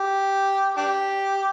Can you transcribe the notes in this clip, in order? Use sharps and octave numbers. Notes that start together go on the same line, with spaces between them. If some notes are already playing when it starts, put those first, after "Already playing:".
Already playing: G4
D4 G4